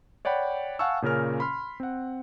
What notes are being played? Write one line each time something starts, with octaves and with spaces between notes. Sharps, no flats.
C#5 D5 F#5 G5 B5
F5 F#5 G#5 A5 C#6 E6
A#2 C#3 C#4 A#4 F6
B5 C6 F6
C4 F#5